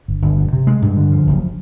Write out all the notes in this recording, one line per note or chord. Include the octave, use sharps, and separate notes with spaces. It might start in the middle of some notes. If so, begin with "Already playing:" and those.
G1
G1
F2
C3
G#3
G2
D3
F3
F#1